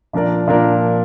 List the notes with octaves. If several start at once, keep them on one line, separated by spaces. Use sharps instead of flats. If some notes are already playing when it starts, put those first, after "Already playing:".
A#2 F3 D4 A#4 D5
A#2 F3 D4 A#4 D5